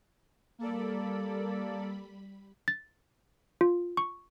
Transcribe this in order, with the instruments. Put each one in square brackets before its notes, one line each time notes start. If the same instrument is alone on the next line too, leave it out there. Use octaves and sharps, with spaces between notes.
[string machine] G3 B5 [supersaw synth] A#3 A4 D5
[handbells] A6
F4
C#6